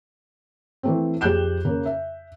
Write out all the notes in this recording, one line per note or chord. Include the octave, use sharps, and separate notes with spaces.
E3 A3 C4
F2 G4 G#4 F#6 G6 E7
C#3 A#3
E5